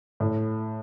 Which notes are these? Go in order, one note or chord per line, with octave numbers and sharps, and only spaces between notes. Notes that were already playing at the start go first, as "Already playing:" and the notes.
A2